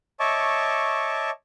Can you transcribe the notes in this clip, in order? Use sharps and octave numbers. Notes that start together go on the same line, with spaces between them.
C#5 D#5 E5 A5 C#6 D6